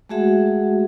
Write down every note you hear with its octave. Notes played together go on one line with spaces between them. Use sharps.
G#3 A3 F#4 G#4 E5 F#5